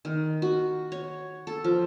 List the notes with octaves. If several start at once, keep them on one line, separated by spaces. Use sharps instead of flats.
D#3
F#4
C#5
A4
F3